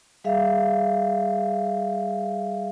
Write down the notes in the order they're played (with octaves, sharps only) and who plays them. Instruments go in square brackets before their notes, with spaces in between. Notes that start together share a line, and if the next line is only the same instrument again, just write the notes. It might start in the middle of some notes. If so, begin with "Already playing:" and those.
[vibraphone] G3 G#4 E5 F5